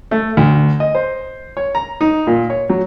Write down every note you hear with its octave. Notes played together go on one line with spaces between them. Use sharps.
A3
D2
D#5
C5
C#5
A#5
D#4
A#2
C#5
F#3